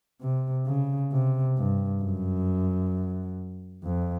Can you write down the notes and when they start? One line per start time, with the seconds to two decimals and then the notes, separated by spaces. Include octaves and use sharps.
0.21 C3
0.66 C#3
1.12 C3
1.58 G2
2.02 F#2
3.84 F2